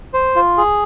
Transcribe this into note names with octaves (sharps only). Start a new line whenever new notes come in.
C5
F4
G#4